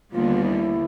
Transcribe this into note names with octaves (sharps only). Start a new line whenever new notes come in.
D#2 D3 G3 B3 F4
E4